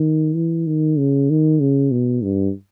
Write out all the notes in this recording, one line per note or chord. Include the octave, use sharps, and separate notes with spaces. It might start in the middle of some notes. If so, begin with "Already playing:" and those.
Already playing: D#3
E3
D#3
C#3
D#3
C#3
B2
G2